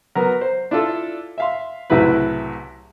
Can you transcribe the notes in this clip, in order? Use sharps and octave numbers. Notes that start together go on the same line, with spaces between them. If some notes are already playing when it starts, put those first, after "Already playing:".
F#3 B3 A#4
C5
D4 E4 F4 A4
E5 F5 C6
C2 A2 C#3 F#3 E4 B4